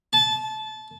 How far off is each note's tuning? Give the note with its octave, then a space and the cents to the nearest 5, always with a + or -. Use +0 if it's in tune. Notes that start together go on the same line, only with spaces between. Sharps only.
A5 -20